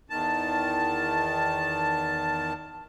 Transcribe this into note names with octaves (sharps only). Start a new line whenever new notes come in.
E2 D#3 A5